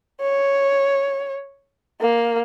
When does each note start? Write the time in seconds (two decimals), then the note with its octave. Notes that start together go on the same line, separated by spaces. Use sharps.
0.21 C#5
2.01 A#3